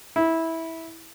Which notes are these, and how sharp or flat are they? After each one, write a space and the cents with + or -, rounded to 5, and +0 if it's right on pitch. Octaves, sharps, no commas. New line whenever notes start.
E4 -15